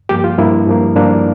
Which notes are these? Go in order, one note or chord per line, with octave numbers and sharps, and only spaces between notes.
G2 F3 A#3 G4
F4
G2 F3 A#3 E4
G2 F3 A#3
G2 F3 A#3 D4